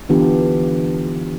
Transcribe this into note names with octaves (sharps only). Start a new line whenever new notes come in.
D3 E3 B3 D4 F4 G4